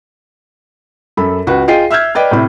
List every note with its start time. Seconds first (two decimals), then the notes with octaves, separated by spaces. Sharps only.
1.17 F#2 A4 B5
1.47 C#2 F#4 B4
1.68 F4 G#4 D#5 G5 C7
1.90 E5 E6 F6 G6 G#6
2.15 B4 D5 D#5 G5
2.31 A2 C3 B5